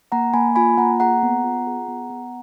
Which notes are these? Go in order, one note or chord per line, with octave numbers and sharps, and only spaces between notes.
A#3 F#5 A#5
A#3 G#5 B5
F4 G#5 B5
A#3 F#5 A#5
G#4 F#5 A#5
B3
F4
G#4
B3
B3